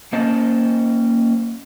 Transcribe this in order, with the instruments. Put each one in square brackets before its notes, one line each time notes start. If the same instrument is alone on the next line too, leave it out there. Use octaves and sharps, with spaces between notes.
[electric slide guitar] A#3 C#4 C5 D#5 A5